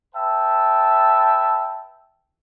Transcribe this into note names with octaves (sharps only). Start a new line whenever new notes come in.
B4 E5 G5 A5